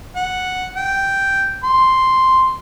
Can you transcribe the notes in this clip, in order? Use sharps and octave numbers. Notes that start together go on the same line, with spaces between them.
F#5
G5
C6